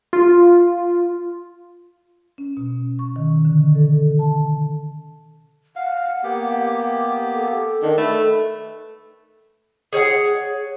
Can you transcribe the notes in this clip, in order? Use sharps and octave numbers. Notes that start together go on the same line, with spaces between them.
F4
C#4
B2
C#6
D#3
D3
A4
A5
F5 F#5
A#3 B3 G4
A4
D#3 D4
A3 B4
G#4 C#5 E5 F#5